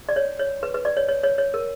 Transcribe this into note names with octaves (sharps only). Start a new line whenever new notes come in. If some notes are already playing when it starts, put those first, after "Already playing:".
D5
C#5
C#5
B4
B4
D5
C#5
C#5
C#5
C#5
A#4